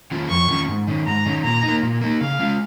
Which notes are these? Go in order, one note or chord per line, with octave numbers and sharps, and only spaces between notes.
D#3 C#4 F4
F2 C#6
D#3 C#4 F4
G#2
D#3 C#4
G#2 A#5
D#3 C#4
A#2 A#5
D#4
A#3
A#2
A#3 D#4
C#3 F5
G#3 C#4 F4